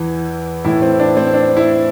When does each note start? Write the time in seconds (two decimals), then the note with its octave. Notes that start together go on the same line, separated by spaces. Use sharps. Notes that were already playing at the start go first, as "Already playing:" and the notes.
Already playing: E2 E3
0.65 A2 E3 E4
0.82 C4
0.99 D4
1.17 C4
1.34 D4
1.57 E4